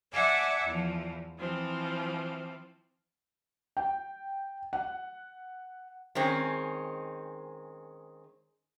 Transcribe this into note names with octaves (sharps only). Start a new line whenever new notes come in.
D5 E5 F#5 G#5 A5 D6
E2 F3
E3 F3 C4
G5
F#5
D#3 G#3 C4 C#4